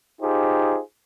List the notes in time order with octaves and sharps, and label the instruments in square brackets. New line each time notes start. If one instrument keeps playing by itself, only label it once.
[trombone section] D#4 F4 G4 G#4 C5